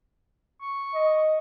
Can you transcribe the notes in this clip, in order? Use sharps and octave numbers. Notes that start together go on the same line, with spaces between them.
C#6
D#5